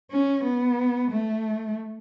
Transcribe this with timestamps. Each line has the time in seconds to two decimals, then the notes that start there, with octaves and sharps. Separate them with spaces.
0.11 C#4
0.44 B3
1.11 A3